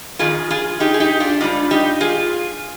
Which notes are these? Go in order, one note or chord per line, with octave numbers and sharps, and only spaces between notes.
F2 C3 D#3 F4 G#4
F4 G#4
D#4 G4
G#4
D#4 G4
D4 F4
G#2 G3 D4 F4
D#4 G4
F4 G#4